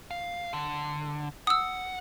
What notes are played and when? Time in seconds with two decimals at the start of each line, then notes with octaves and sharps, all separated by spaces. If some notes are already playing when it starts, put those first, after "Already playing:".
0.11 F5
0.53 D3
1.47 F#5 D#6 E6